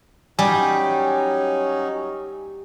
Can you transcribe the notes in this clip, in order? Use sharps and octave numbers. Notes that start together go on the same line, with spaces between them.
F#3 G3 C#4 D#4 G#5